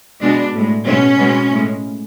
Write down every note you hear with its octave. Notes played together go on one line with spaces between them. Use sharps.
B2 G#3 D4
A2 G#3
B2 G#3 C#4
B2 G#3
A2 G#3